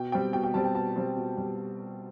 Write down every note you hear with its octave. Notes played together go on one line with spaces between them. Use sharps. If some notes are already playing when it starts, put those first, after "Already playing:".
Already playing: B2 G5
G3 C4 G5
B2 G5
G5
G3 C4 A5
G5
B2 A5
G3 C4
B2
G3